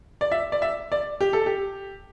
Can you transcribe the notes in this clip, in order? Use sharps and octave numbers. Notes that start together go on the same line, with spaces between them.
D5
E5
D5
E5
D5
G4
A4
G4